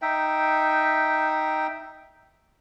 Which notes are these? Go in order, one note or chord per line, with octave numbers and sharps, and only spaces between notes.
D#4 E5 G5